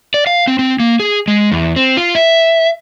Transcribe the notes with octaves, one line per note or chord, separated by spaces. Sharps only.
D5
F5
C4
C4
A#3
G#4
G#3
E2
C4
F4
E5